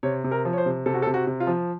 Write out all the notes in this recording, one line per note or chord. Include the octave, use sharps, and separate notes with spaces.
C3 C#5
C3
A#4
F3
C#5
C5
C3
C3 A4
F#4
A4
C3
F#4
C3
F4
F3